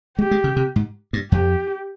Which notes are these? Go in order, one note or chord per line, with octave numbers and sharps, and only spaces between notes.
G#3 G4
G#3
C#3
C3
G#2
G2
F2 G4